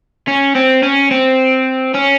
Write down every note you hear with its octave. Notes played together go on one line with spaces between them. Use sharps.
C#4
C4
C#4
C4
C#4